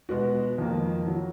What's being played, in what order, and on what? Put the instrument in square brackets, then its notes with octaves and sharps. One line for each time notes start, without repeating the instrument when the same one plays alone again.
[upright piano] B2 G#3 B3 F#4
F2 D#3 A#3
F#3